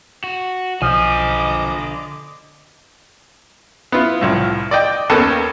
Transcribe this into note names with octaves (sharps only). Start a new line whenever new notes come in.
F#4
B1 D3 F3 D#5 G#5 D6
B3 E4 F4
C2 A2 F3
D5 D#5 G5
D#2 A#3 B3 C#4 A4 A5